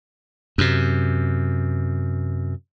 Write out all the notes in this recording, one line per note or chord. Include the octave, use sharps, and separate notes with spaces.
F#2 C3